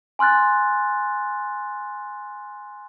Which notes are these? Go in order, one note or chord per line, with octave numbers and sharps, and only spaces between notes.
G#5 C6 F6 F#6 A6